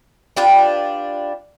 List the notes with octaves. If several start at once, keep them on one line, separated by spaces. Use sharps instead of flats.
D4 F4 G4 B4